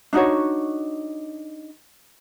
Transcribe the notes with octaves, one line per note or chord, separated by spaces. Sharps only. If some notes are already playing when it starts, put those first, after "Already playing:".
D4 D#4 F#4 C#5